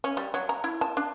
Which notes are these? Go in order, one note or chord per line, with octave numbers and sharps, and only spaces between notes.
C#4
G3
F#3
A#5
E4
A5
D4